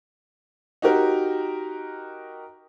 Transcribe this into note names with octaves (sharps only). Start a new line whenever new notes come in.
D#4 F#4 G4 A#4